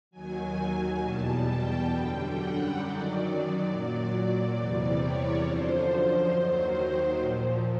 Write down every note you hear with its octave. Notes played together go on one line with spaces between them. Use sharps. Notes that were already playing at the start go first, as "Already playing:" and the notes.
D#2 D#3 F#3 G#5
E2 B2 G3 A5
G5
F#2 D3 G3
F#5
F#2 D#3 F#3 D5
D5
A#2 F#3
E2 C3 E3 G3 D5
C#5
F#2 D3 F3 C5
C5
D#2 D#3 F#3
A#2 F3